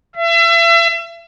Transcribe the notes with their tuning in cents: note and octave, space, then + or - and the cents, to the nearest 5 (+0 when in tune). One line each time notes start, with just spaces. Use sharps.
E5 +35